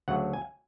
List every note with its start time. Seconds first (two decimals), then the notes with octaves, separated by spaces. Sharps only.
0.08 D2 C#3 F#3 A3 F#5
0.33 G#5